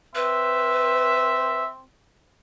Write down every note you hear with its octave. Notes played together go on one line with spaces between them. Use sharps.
C4 B4 E5